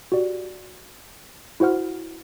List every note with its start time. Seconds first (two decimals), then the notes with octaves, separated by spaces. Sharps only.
0.12 F#4 G4 D5
1.60 E4 F#4 C5 F#5 F6